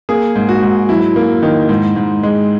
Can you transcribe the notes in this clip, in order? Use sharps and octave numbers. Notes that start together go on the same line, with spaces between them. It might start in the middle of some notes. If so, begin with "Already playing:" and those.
A#3 G#4
G#2
F#4
G#2
F#3 E4
A#3
D#3
G#2
G#2
G#3